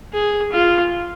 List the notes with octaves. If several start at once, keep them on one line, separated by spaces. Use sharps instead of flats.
G#4
F4